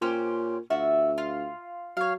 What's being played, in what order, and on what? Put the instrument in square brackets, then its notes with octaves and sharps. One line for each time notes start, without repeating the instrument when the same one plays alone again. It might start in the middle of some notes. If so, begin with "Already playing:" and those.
[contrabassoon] A#2 [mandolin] C#4 G4 C5
[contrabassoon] D2 [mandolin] F4 F#4 E5
[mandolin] F4
[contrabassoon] F#3 [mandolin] C#5 F5